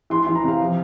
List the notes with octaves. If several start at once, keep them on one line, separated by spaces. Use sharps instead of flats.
E3 C6
C6
E3
A#5
C3 F5
F3